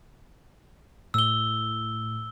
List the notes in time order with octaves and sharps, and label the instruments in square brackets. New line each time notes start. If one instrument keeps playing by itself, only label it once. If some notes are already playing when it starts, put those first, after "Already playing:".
[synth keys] A2 [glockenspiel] E6 G7